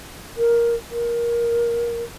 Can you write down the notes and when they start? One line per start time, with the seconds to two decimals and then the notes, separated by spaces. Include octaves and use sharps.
0.37 A#4
0.91 A#4